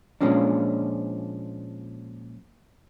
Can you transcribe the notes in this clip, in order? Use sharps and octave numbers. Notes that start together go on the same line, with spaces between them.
A#2 F3 G#3 C#4 D4